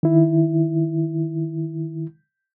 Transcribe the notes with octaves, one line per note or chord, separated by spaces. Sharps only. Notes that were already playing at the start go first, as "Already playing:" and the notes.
D#3 E4